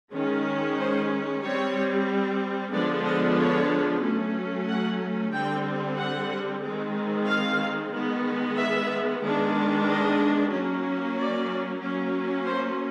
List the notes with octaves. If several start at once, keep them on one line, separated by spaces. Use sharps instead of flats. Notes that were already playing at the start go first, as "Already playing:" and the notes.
D#3 G#3 C#4
C5
G3 C4 C#5
D3 F3 G#3 B3 D4 D5
D#5
C#5
F#3 A3 C#4
F#5
D3 G3 C4 G5
F#5
D#3 G#3 C4
F5
D#3 G#3 B3
E5
D#3 G#3 B3 D4
D#5
F#3 A#3 C#4
D5
F#3 A#3 C#4
C5